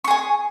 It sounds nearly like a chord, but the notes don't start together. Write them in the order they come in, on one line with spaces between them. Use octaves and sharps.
C#6 G#4 G#5